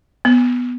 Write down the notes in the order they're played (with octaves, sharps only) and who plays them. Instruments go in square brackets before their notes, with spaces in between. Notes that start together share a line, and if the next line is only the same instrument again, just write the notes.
[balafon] B3